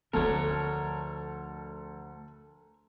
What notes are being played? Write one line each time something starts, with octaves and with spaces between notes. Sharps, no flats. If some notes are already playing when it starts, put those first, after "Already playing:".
D2 F3 A3 A4 A#4 C#5